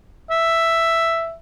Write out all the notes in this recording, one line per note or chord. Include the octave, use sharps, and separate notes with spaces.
E5